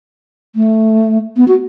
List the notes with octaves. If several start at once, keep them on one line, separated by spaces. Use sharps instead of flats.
A3
B3
F#4